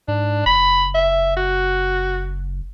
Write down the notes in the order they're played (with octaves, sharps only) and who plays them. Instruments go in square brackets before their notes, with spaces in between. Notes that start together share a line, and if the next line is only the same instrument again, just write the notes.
[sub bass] G#2 [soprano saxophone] D4
[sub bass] F#1 [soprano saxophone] B5
[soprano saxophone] E5
F#4